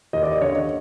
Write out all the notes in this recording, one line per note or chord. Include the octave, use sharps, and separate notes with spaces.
D#2 D#5
D5
D#5
D3 C#5